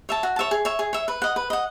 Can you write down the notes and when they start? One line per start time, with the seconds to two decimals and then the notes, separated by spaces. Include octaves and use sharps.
0.09 C#5 E5 A5
0.23 F#4
0.36 C#5 E5 A5
0.51 G#4
0.65 C#5 E5
0.79 G#4
0.93 C#5 E5
1.08 B4
1.22 D#5 F#5
1.36 B4
1.50 D#5 F#5